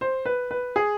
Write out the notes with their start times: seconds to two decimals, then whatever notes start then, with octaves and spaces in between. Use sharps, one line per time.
0.01 C5
0.25 B4
0.51 B4
0.76 G#4